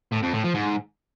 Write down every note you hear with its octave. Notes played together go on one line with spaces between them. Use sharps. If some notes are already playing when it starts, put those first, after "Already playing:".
A2
F2
A2
F3
G#2